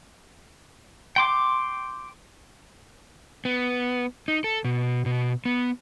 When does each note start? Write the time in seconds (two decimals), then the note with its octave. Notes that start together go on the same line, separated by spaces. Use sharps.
1.16 G5 C6 D6
3.45 B3
4.28 D#4
4.44 A4
4.65 B2
5.06 B2
5.45 B3